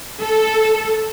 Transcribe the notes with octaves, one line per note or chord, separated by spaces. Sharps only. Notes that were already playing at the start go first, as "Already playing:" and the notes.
A4